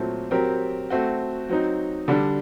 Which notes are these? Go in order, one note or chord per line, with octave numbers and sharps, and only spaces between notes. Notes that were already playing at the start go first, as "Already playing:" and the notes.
Already playing: A#2 F#3 A3 C4
F#3 C4 G4 A#4
A3 C4 F#4
F#3 C4 D#4
D3 G3 D4